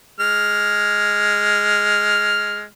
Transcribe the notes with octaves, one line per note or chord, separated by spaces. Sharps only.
G#3 F6